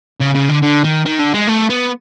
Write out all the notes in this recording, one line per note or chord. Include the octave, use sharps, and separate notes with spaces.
C#3
C#3
D3
D3
D#3
D#3
D3
G#3
A3
B3